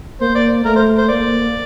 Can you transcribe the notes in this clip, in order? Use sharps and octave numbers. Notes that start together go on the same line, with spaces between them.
A#3 C5
D5
A3 A#4
C5
C5
A#3 D5